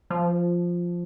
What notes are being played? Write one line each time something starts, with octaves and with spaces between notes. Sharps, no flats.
F3